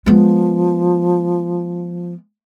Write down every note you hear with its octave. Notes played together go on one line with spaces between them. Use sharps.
F3 G#3 B3